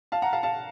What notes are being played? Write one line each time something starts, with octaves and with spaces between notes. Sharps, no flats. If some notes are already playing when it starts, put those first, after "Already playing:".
F5 A5
F#5 A#5
F5 A5
F5 A5